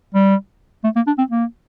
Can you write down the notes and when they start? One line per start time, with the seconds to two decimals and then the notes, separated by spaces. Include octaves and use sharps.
0.14 G3
0.84 A3
0.96 A#3
1.07 D4
1.18 C4
1.30 A#3